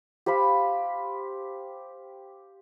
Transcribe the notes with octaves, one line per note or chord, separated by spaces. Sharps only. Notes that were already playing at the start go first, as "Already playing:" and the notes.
G4 C5 F5 B5